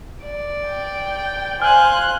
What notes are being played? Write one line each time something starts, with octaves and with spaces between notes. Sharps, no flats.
D5
G5
C5 F5 G#5 F6 F#6